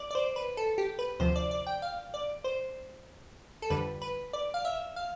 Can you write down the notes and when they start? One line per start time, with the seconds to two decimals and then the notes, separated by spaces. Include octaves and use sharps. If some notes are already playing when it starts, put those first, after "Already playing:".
Already playing: D5
0.11 D5
0.15 C5
0.36 B4
0.57 A4
0.78 G4
0.99 B4
1.20 D2 C3 F3 C5
1.36 D5
1.51 D5
1.67 G5
1.82 F5
2.14 D5
2.44 C5
3.62 A4
3.70 F2 D3 G3 B4
4.02 B4
4.33 D5
4.54 F5
4.65 E5
4.96 F5